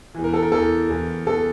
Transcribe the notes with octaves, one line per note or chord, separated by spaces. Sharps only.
E2 E3
A#4
A4
A#4
E2 E3 A4
E2 E3
E2 E3 A4